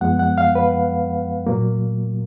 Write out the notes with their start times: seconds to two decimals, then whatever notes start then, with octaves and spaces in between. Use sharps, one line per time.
0.01 F#2 F3 G#3 B3 F#5
0.19 F#5
0.38 F5
0.55 B4
1.47 A#2 F#3 A#3